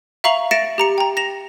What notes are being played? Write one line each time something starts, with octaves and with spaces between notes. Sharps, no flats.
E5 F5 A#5 C#6 F7 F#7
E5 A6 A#6 C#7 D7 E7
G4 A#5 C#7
G5 A#5
A#6 E7 F7